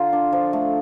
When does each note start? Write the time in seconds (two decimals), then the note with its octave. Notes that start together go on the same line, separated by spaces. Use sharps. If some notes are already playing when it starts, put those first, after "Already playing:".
Already playing: D3 F4 A#5 C6
0.13 D4
0.33 F3
0.53 A3